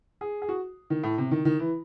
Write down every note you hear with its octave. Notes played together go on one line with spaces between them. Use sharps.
G#4
G#4
F#4
D#3
A2
C3
D#3
D#3
E3